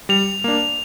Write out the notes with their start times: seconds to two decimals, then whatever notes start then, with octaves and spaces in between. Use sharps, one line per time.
0.09 G3 F7
0.44 A#3 D4